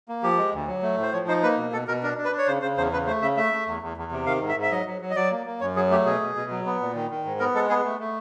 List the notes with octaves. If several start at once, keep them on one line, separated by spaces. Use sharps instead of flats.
A#3
F3 G4
G#3
D2
F#3
A3
A2 C5
F3 C#5
D#4 C5
A#3 B4
B2
B2 A4
B2 A#4
D4 A#4
D4
B4
D4
C#5
C#3 C5
C#3 C5
E2 C5
C#3 B4
A3 C5
C#3 E5
A3 E5
A3
E2
E2
E2
C3
D#3 F5
G#2
E5
G#2
E5
F#3 D#5
F#3
F#3
D#5
F#3 D5
A#3
A#3
F#2 C#5
F#3 G#4
A3 G4
B2 G#4
B2
B2
F#3
B3
A#2
D#3
D#3
G#2
B3 A#4
G#3 A4
B3 G#4
A3
A3